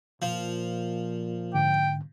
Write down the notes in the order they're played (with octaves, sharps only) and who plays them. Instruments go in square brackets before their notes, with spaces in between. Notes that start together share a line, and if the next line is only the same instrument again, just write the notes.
[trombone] A#2 [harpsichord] F3
[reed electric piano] G#2 D3 [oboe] G5